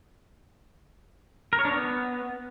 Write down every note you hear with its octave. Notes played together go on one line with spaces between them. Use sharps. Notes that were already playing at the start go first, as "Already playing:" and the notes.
A#4
C#5
D4
B3